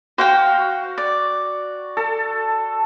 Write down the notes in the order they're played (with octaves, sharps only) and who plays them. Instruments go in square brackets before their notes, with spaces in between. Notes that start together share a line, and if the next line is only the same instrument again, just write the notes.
[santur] F#4 [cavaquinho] C5 F5 G5
[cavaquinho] D5
[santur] A4